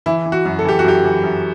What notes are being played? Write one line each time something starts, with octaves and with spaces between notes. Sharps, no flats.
E3 E4
E3
F#4
F#2
A4
E3 G4
F#4
F#2 G4
E3
F#2